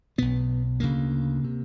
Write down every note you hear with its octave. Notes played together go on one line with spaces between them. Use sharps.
B1 B2 B3
D2 C#3 A#3
C3